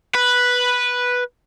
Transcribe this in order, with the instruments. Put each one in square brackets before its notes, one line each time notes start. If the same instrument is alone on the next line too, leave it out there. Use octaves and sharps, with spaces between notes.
[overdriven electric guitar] B4